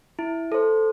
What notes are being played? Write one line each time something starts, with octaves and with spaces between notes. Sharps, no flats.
E4
A4 C5